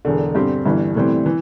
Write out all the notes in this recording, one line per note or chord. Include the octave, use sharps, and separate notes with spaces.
E1 E2 D3
G2 D3 C4 G4
G1 G2 E3
A2 E3 G3 C4
E3